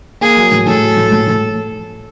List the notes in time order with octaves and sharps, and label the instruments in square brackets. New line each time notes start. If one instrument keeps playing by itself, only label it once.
[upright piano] A#3 [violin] G#4
[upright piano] F#3
A2
[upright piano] A2 [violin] A4
[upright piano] F#3
A2
A2
A2